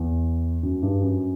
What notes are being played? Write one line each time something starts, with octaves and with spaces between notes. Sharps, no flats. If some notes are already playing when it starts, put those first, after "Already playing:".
Already playing: E2
F#2
G2
F#2